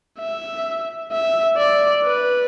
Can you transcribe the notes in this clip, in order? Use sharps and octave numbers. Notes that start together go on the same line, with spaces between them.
E5
E5
D5
B4